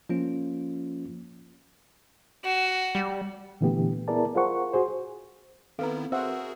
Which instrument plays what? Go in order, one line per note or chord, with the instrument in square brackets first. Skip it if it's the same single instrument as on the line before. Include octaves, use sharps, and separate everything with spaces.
[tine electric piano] F3 A#3 C#4 F4
[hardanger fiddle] F#4
[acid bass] G3
[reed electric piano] A#2 D3 E3 A3 B3 G4
B3 E4 G#4 A#4 D5 A5
F4 G#4 A#4 C5 F#5 C#6
F#4 G#4 C5
[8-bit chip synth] D#3 B3 E4 [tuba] C4 [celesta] A4 B4 A#5 [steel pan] F5
[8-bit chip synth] F#4 G#4 A#4 [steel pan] C5 E5 F#5 [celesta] E6